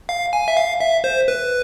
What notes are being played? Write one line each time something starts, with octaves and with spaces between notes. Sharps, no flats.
F5
G#5
E5
F5
E5
C5
B4